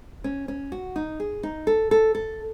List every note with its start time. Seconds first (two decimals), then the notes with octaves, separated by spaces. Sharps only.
0.24 C#4
0.48 C#4
0.72 F#4
0.96 D#4
1.20 G#4
1.43 D#4
1.67 A4
1.91 A4
2.15 A4